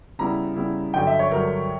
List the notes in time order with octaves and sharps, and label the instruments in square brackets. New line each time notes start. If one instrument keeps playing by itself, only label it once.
[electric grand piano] C#3 G3 B3 E4 [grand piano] A#5
[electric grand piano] C#3 G3 B3 E4
[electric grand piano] G2 D3 F#3 [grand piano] G5
[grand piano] E5
C#5
[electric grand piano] G2 D3 F#3 [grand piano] A#4